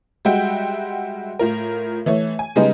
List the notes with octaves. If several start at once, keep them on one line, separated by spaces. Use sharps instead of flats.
G3 G#3 F#4 E5 F#5 G5
A2 F4 A#4
E3 A3 C#5
G#5
C#3 G3 G#3 B3 D#4